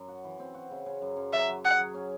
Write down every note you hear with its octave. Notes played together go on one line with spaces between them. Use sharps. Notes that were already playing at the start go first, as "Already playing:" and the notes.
Already playing: F#2
F#4
E3
C4
F#4
C#3
C#3
F#2
F#2
F#3 E5
F#3
G#4 F#5
F#3
C#4